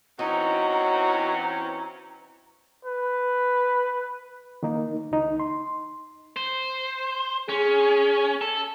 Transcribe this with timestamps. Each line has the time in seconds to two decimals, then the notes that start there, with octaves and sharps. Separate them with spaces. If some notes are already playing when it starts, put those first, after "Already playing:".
0.19 E3 C4 C#4 D#4 F#4 A#5
2.85 B4
4.63 D#3 A#3 D#4
5.11 C#2 D#4
5.40 C6
6.36 C5
7.49 C#4 G#4
8.41 A4